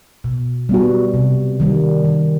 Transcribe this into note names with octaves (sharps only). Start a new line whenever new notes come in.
B2
G3 B3 F#4
C3
D#3 G3
D#3